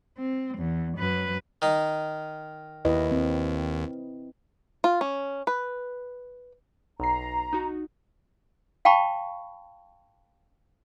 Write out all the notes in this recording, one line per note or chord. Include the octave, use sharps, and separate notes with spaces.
C4
E2
F#2 B4
D#3 D#4
D#2 E4 B4 D#5
C4
F4
C#4
B4
B1 A#5 C7
D#4 F#4
F5 G5 A5 B5 C#6